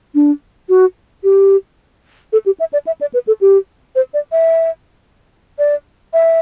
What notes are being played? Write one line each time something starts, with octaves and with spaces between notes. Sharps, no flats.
D4
F#4
G4
A4
G4
E5
D5
E5
D5
B4
A4
G4
C5
D5
E5
D5
E5